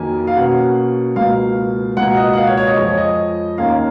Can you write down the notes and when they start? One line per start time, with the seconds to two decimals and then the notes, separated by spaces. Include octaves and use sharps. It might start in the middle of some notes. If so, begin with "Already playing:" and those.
Already playing: F2 D#3 F#3 A#3 G#5
0.27 F5
0.36 B2 A#3 C#4 F#5
1.16 C#2 B2 A#3 F5
1.97 C#2 B2 A#3 F#5
2.17 D#5
2.33 F#5
2.37 F5
2.47 C#5
2.57 C#5
2.67 D#5
2.77 F2 F3 G#3 C#5
2.98 D#5
3.58 D#2 D#3 A#3 C#4 F5